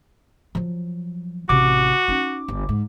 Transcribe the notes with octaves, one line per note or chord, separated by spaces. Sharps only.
F3 F#3
A1 C3 F#4 D6
C#4 D#4
G1
G#2